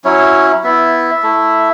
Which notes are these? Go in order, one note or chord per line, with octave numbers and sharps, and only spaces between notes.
F#3 C#4 E4 C#5
B3 E4 E5
A3 E4